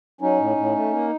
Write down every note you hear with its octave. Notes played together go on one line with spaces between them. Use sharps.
F#3 C#4 D#4
A2
A2
A3
A#3